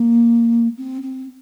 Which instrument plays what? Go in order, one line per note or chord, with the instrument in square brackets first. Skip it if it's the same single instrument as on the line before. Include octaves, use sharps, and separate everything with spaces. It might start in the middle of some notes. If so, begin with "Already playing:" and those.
Already playing: [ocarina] A#3
C4
C4